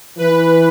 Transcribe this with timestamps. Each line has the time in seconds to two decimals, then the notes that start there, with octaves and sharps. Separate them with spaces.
0.18 E3 B4